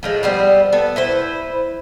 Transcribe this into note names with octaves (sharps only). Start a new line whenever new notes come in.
A2 F3 G#3
G3 B3 C4
B3 A4
E4 B4 C5